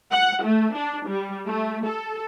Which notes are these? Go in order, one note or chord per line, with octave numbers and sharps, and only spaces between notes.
F#5
A3
D4
G3
A3
A4